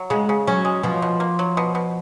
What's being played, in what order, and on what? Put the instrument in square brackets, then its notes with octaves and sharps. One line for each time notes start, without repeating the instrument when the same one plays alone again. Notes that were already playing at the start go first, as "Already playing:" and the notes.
Already playing: [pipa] F#3
[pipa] C#3 [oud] G#3
[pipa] C#3
[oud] F#3 [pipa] C#4
[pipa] G#3
[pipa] B2 [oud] F3
[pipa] B2
A#3
F#3
B2
B2